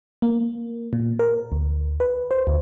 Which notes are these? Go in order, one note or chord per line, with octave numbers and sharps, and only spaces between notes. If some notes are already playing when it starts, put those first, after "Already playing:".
A#3
A#2
A#4
D2
B4
C5
D2